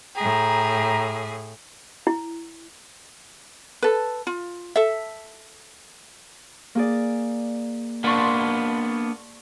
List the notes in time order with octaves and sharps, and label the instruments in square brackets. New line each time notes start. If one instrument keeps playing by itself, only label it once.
[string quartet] A2 G#4 [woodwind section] G5 A#5
[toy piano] E4
[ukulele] A4 B4
F4
A4 E5
[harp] A#3 G#4 D5
[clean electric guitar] A#3 B3 D4 [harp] A5 C6 C#6